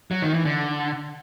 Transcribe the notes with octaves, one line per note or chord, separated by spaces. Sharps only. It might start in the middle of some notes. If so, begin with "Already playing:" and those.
F#3
D#3
E3
D3